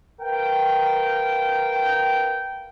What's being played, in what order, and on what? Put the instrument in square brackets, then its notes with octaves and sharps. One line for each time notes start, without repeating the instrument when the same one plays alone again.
[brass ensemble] A#4 B4 F5 G5